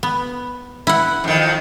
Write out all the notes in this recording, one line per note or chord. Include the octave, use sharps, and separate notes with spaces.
B3
E4 F#5
F2 D#3